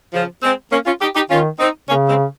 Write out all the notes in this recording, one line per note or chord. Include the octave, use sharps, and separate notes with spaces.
C#3 F3
G#3 C4
A#3 C#4
C#4 F4
D#4 G4
D#4 G4
D#3 C#4 F4
C4 D#4
C#3 A#3 C#4
G#3 C4